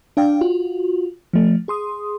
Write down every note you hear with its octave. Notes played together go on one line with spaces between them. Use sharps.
D4 D5 F5 G5
F4 F#4
F3 A3
G#4 C6 D#6